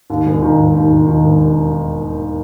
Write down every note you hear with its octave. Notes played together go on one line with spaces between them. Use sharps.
D#2
E1
D#3
E1
D#2
E1
D#3
E1